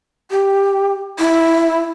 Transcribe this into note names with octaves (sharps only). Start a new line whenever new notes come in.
G4
E4